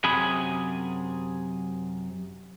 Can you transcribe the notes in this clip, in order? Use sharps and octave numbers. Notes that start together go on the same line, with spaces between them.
F#2 C3 G#4 B5